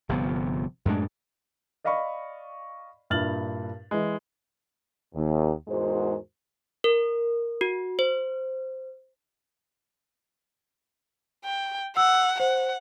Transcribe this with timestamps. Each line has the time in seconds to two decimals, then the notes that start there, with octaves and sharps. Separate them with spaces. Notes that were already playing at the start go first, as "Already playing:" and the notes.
0.09 G1 C3 F3 B3
0.85 F#2 A2 G#3 D4
1.84 D5 D#5 F5 B5 C#6
3.10 G2 A#2 E4 F6 A6 F#7
3.91 E3 G#3
5.14 D#2
5.68 E2 G#2 G#3 F#4 A#4 C5
6.84 A#4
7.61 F#4
7.99 C5
11.44 G5
11.97 F#5 E6
12.40 C5 F#5